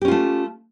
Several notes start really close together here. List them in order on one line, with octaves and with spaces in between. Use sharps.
G4 C#4 F4 A3